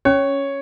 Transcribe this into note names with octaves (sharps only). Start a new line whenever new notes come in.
C#4 C#5